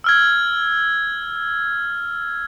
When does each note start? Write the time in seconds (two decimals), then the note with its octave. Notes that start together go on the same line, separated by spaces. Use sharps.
0.04 E6 F6 G#6